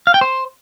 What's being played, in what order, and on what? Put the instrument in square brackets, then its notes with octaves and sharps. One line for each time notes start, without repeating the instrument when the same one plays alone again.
[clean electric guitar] F5
G5
C5